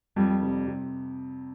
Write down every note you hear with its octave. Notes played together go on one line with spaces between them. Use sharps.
F2 G3
C3 G3
C3